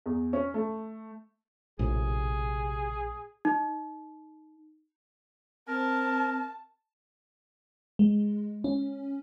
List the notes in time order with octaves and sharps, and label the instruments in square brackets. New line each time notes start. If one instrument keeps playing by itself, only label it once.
[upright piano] E2
C#4
A3
[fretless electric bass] A#1 A2 [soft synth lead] C3 [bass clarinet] G#4
[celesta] D#4
[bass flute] C4 [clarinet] A#4 [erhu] A5
[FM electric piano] G#3
C#4